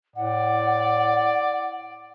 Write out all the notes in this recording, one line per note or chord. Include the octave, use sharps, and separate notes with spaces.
A2 D5 F#5